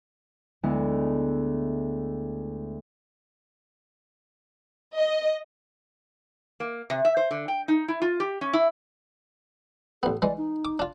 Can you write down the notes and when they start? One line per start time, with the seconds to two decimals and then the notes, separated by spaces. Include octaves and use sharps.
0.63 D2 G#3 B3 E4
4.96 D#5
6.60 A#3
6.90 C3
7.05 E5
7.17 C5
7.31 D3
7.48 G5
7.68 D#4
7.88 E4
8.02 F4
8.20 G4
8.41 C#4
8.53 E4
10.03 A1 B3 A4
10.22 E3 G#3 D5
10.37 D#4
10.65 D6
10.79 D4 F4